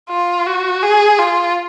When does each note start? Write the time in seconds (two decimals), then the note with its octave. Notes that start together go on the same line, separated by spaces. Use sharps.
0.10 F4
0.47 F#4
0.83 G#4
1.19 F4